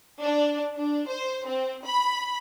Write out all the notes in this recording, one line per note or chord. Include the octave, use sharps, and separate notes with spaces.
D4
D4
C5
C4
B5